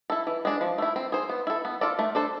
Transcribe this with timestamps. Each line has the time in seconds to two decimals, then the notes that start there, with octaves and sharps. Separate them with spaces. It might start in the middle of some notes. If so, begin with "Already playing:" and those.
0.10 E4 A4
0.27 E3
0.45 G#3 D4
0.61 F3
0.78 A3 E4
0.96 C4
1.12 G#4 C5
1.30 B3
1.47 E4 A4
1.65 B3
1.81 F4 A4 D5
1.99 A3
2.15 D4 A4 C5